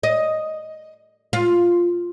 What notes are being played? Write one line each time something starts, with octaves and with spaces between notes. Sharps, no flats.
D#5
F4